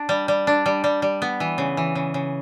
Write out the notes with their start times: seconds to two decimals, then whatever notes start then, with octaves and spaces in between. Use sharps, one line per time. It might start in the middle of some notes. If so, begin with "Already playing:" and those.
Already playing: D4
0.09 G3
0.28 G3
0.47 D4
0.66 G3
0.84 G3
1.02 G3
1.22 B3
1.40 E3
1.58 C#3
1.77 E3
1.95 C#3
2.14 C#3